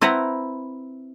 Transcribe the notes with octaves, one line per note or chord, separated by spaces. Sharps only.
C4 E4 B4 F#5 A#5